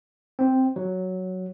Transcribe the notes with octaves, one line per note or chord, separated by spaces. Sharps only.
C4
F#3